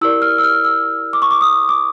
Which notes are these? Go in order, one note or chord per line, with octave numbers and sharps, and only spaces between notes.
E4 G4 A#4 D5 E6
F6
E6
F6
E6
D6
C#6
D6
D#6
D6